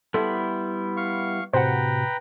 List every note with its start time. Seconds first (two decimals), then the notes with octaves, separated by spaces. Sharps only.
0.14 G3 B3 E4 A4 C6
0.97 F5 C#6
1.53 A2 C3 F#4 B4 C5 F#5 G5 A#5